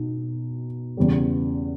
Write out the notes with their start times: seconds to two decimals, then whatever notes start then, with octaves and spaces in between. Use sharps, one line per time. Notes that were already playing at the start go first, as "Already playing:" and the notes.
Already playing: B2 D#4
0.97 E2 C#3 G3